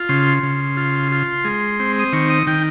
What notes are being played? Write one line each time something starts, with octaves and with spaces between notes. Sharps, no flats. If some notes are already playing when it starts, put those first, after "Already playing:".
Already playing: F4
C#3 C6
C#3
F4
F4
G#3
C4
D#6
D#3 C#6
D#6
D#3 G5